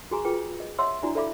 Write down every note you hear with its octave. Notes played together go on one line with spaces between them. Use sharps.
F#4 G#4 G#5 A#5 C#6
F4 G#4 B4 G5
D#5
C#5 D#5 E5 F#5 C6 E6
D4 E4 F#4 D5 G#5 A#5
A4 D5 E5 F5 B5 D6